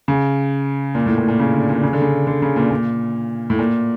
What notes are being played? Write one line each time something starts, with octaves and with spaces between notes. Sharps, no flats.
C#3
A#2
A2
A#2
A#2
C#3
D3
A#2
C#3
D3
C#3
D3
C#3
A#2
A#2
A2
A#2